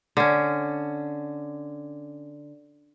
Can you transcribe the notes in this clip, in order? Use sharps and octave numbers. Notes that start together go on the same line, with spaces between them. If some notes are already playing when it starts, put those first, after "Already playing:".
D3 C#4